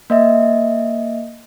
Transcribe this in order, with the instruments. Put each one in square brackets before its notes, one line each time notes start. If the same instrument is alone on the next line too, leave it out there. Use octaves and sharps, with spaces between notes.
[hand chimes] A#3 D#5 E5